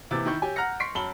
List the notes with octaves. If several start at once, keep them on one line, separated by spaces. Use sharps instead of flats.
C3 E3 A#3 E6 A6
D#3 E4 C#6 G6
G4 C#5 G#5
F#5 A#5 F6 F#6 A#6 C#7
C6 C#6 B6 C7 D7
F#2 A5 B5 F#7 G7